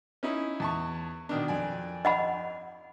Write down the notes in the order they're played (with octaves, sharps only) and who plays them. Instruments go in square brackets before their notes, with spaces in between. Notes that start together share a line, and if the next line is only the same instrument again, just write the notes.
[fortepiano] C#4 D#4 E4
E2 A5 C#6
B2 D#3 D4
F2 D5 G#5
[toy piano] D#5 F#5 B5